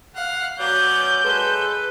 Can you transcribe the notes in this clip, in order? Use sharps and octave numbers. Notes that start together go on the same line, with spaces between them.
F5 F#5
F#3 B3 C#4 D5 G6
G#3 A4 B4